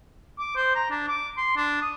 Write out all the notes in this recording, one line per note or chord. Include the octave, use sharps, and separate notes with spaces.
D6
C5
A#5
D4
D6
C6
D4
D#6